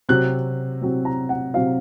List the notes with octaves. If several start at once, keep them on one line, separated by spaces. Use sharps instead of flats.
C3 F#3 C4 F#6
C3 F#3 C4
A#5
F#5
C3 F#3 C4 F5